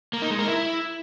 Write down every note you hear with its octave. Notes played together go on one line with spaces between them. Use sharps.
A#3
D#4
G#3
A#4
E4